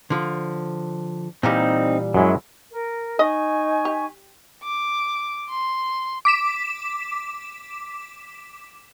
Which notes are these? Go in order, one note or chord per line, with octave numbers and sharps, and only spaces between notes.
D3 F3
A#2 E3 G3 C4 D#4
F#2 F#3 G#3 E4
A#4
D#4 D#5 G#5 C#6
G4
D6
C6
D6 B6 E7